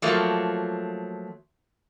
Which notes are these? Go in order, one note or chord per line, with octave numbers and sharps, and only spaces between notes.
F3 F#3 A3 A#3